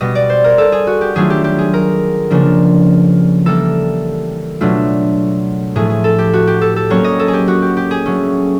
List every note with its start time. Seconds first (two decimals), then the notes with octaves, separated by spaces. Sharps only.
0.01 B2 G3 B3 D#5
0.15 D5
0.29 C5
0.44 A#4
0.58 A4
0.72 G#4
0.87 F#4
1.01 G4
1.15 D#3 F#3 A3 D4 F4 G#4
1.30 G4
1.44 G4
1.59 G#4
1.74 A#4
2.30 C#3 F3 A#3 D4
3.45 E3 G3 A#3 A4
4.61 B2 F#3 A3 D4 F4
5.76 A2 F3 A3 G#4
5.90 G#4
6.04 A4
6.19 G4
6.33 F#4
6.47 G4
6.61 A4
6.76 A4
6.90 F#3 A#3 C#4 C#5
7.04 D#5
7.19 A4
7.28 G#4
7.33 G4
7.48 F#4
7.62 G4
7.77 G4
7.91 G#4
8.06 F#3 A3 C#4